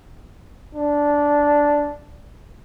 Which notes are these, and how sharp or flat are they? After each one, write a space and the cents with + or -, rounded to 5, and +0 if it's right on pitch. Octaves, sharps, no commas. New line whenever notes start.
D4 -10